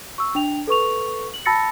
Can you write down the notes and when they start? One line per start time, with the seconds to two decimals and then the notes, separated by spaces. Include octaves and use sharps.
0.18 C#6 E6
0.35 D4 G5 F7
0.67 A4 B4 C#6 F7
1.34 F#7
1.46 A5 B5 E6 A6 A#6 C#7